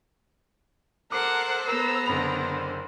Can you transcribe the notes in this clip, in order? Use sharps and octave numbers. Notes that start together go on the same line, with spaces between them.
A4 A#4 C5 F#5 D6
B3 A#4 A#5 E6
F#1 D3 C5 B5 F7